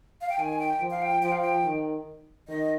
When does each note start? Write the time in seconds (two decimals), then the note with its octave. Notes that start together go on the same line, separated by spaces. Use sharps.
0.21 F5
0.29 G5
0.38 D#3 G#5
0.59 G5
0.81 F3
0.91 F5
1.02 G5
1.22 F3 G5
1.32 F5
1.41 G5
1.64 D#3
2.48 D#3 D#5